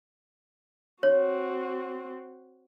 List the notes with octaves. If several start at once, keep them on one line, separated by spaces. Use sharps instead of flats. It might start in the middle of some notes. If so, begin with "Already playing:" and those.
C4 F#4 C#5